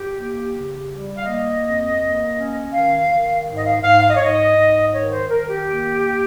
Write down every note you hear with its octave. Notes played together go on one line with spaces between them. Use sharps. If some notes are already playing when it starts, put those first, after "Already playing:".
Already playing: G4
A#3
C#3
G3
F5
A#3 D#5
F2
A#3
C#4
D#3 F5
D#3
G#2
D#5
F5
G#2 F5
F5
D#5
C#5
G#2
D#5
G#2
D#3 C#5
C5
D#3 A#4
G4
A#3